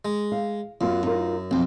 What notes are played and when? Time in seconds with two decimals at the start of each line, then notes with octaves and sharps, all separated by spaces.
0.05 G#3
0.32 F5
0.81 F#2 B3 F4
1.03 D#4 F4 A#4
1.51 B1 F2 C4